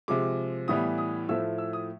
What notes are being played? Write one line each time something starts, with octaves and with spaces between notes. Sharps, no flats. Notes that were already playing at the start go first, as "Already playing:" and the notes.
C3 F3 G#3 D6
A2 E3 G3 B3 D#6
D#6
A2 F3 A3 E6
E6
D#6